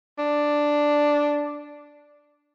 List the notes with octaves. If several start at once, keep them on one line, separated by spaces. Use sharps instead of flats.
D4